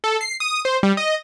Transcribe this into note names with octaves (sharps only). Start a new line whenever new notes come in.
A4
C7
D#6
C5
G3
D#5